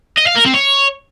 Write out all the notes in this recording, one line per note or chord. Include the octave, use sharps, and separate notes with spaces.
D#5
F5
A#4
C4
C#5